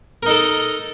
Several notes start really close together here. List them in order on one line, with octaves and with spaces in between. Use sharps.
A#4 D#4 A4